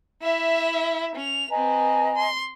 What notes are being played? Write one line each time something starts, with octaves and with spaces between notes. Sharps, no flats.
E4 E5
C#4 F7
C4 B4 D#5 G#5 A#5
C6